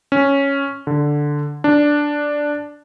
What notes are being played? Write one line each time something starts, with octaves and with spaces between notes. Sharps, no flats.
C#4
D3
D4